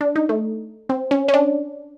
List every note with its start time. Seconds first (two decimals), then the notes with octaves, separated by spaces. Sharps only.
0.01 D4
0.16 D#4
0.29 A3
0.89 C4
1.11 C#4
1.28 C#4
1.34 D4